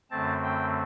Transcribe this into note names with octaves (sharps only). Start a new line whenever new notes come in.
F#2 D3 A3 C4 A5
G5